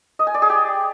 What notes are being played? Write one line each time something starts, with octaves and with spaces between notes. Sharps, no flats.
D#5
G#5
D5
G#4
G4